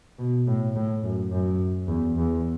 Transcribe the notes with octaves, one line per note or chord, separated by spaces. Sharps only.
B2
A2
A2
F#2
F#2
E2
E2